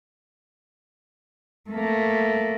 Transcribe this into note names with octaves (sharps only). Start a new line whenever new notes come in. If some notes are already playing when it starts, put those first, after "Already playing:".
A3 A#3